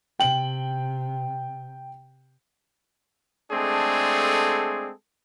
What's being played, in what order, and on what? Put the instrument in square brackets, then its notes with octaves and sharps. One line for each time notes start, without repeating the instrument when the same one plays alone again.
[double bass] C3 [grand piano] G5 F#7
[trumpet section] G#3 A3 C4 D4 G#4 A4